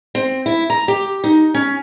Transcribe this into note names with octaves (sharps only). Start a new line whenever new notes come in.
C4
E4
A#5
G4
D#4
C#4